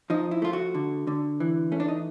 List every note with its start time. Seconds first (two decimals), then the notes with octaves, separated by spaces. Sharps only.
0.10 F3 D#4
0.31 E4
0.42 A3 F4
0.53 F#4
0.74 D3
1.07 D3
1.40 E3
1.72 A3 C#4
1.80 D4
1.88 D#4